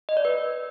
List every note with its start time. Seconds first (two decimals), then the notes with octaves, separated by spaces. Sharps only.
0.09 D#5
0.17 D5
0.25 B4